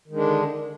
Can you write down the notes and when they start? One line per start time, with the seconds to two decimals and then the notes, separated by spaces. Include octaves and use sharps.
0.08 D#3
0.12 G#3
0.15 D4
0.19 D3